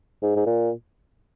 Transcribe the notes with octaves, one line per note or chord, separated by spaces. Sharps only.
G#2
G#2
A#2